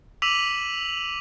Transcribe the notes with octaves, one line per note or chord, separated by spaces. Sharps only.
D6 E6 B6 D#7 F7 F#7